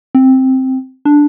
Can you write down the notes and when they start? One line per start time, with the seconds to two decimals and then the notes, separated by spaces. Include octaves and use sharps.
0.15 C4
1.05 D4